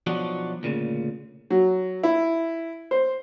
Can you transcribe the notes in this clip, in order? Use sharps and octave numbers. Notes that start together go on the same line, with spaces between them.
B2 F3 F#3 D4 D#4 F#4
D2 A#2 C#3
F#3
E4
C5